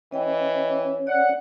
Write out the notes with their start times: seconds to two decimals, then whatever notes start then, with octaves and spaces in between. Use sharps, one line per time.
0.12 E3 C#4 D#5 G5
1.07 D5 F#5